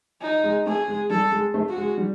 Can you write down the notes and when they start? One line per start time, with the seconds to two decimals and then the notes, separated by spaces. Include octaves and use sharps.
0.22 D#4
0.44 G#3
0.66 A3 G#4
0.88 G#3
1.10 G3 A4
1.32 G#3
1.54 A3
1.69 F#4
1.77 G#3
1.97 G3